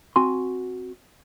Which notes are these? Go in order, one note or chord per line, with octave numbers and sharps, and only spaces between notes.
C4 F#4 G#5 C6